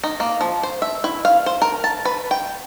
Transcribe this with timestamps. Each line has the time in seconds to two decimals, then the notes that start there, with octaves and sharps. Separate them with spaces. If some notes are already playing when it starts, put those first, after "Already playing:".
0.04 D#4
0.20 A#3
0.41 F3
0.63 C5
0.82 E5
1.04 E4
1.25 F5
1.46 C5
1.62 A#4
1.84 A5
2.05 B4
2.31 G5